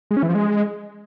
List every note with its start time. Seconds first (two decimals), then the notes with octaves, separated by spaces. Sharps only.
0.11 G#3
0.17 C#4
0.23 E3
0.29 F3
0.35 G#3